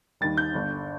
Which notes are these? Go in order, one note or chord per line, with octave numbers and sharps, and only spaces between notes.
D#2 D#3 G3 A6
G6
G1 G2 D3